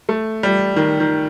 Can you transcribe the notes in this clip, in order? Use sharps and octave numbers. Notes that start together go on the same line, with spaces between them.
A3
G3
D#3
D#3